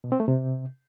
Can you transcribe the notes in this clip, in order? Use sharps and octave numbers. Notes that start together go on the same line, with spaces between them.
B2
C4
A3
C3